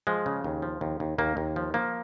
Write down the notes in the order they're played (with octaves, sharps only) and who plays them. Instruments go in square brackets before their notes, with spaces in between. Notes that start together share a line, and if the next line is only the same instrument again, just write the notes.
[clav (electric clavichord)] F3 G#3
C#3
D#2
F3
D#2
D#2
D#2 A#3
D#2
F3
F3 A#3